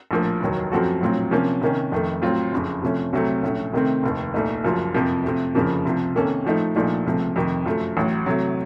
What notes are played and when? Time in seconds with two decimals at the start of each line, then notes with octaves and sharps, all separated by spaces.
0.11 A#1 A2 F3 A#3
0.40 F1 D#2 D#3 F#3
0.72 F#2 F3 C4 F#4 A4
1.01 A#1 A2 F#3 C4 F4
1.31 C3 F3 A#3 C#4
1.61 C3 D#3 A#3 C#4
1.91 F1 F2 D#3 A3
2.22 A2 F#3 C4 F4
2.52 F#1 F2 C#3
2.82 C3 F3 A3 C#4
3.13 C2 C3 F#3 A3 C4
3.43 A#1 A2 A3 C#4
3.73 C3 D#3 A3 C4
4.03 F1 D#2 D#3
4.34 C2 A#2 A3 D#4
4.63 F#1 F#2 F3 A#3 F4
4.94 F2 C3 F3 A#3
5.24 C3 F3 A3
5.55 F#1 F2 C#3 F3 A#3
5.85 C2 C3 F3
6.16 C3 D#3 A#3 C#4 A4
6.45 A2 F3 A3 D#4
6.75 A#1 A#2 F3 A3 D#4
7.06 C#2 C3 F3 A3
7.36 F2 C3 D#3
7.66 F#2 F3 A3
7.97 A1 A2 F#3
8.26 C3 F#3 A3